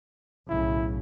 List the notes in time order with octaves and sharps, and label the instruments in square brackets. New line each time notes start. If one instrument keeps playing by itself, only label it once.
[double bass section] B1 A2 C#3 [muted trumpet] E4